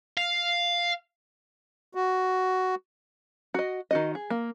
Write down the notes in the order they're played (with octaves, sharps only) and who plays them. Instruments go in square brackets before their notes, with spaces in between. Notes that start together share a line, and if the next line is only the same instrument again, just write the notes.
[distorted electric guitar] F5
[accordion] F#4
[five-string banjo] F#4 D#5
D#3 F#4 D#5
G#4
A#3